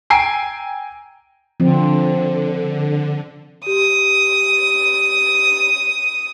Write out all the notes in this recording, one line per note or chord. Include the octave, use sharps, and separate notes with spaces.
G5 G#5 A#5 E6 C7 D7
D3 F3 C4
G4 D#6